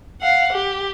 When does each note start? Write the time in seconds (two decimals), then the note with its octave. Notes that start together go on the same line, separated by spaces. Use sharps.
0.21 F5 F#5
0.53 G4